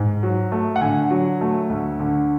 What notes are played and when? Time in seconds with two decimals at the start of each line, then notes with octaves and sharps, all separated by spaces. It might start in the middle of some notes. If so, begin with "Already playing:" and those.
Already playing: G#2
0.23 F#3
0.52 A3
0.76 F#5
0.81 D3 G#5
1.11 F#3
1.41 A3
1.69 D2
2.00 D3